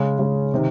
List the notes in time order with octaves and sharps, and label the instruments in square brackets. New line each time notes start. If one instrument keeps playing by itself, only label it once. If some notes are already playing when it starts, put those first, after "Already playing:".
Already playing: [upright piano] C#3 G#3 C#4
C#3 G#3 C#4
C3 D#3